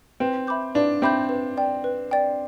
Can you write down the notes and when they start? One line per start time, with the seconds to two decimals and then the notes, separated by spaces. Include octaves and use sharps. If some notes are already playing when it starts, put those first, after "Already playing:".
0.20 C4 B4
0.47 E5 B5 D6 G6
0.75 D4 B4
1.02 C4 E5 B5 D6 G6
1.29 B4
1.57 D5 G5
1.84 B4
2.11 D5 G5